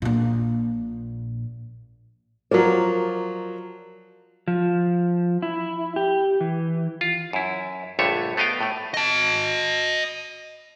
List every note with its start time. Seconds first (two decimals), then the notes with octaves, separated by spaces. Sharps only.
0.02 A#1 A#2
2.51 F3 F#3 A#4 D5
4.48 F3
5.42 E4
5.96 G4
6.41 E3
7.01 F4
7.33 F#2 E4
7.99 A#1 G2 D3 A3 C#5 E5
8.37 A3 B3 D#5 F5 G5
8.61 A2 A3
8.94 D#5 A5